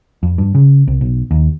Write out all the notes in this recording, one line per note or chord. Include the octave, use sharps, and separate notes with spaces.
F2
G2
C#3
C2
B1
D#2